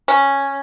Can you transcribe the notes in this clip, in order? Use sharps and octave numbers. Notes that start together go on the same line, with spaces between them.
C#4